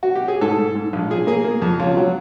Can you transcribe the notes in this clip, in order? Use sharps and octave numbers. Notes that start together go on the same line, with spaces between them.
F#4
G4
G#4
G#2 A4
G#2
G#2
A#1
F3 G#4
A#3 G#4
A#3
F2
C#2 F4
F#3